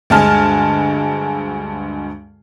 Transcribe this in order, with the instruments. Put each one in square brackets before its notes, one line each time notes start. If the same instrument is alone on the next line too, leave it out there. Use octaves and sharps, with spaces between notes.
[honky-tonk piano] D2 G2 G#3 G#5 A5 F6